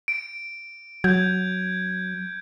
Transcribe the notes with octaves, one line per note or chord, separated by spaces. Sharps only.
D7
F#3 G6 G#6